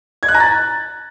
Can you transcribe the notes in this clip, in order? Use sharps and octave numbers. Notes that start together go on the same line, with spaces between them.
G#6
F#6
A#5
A6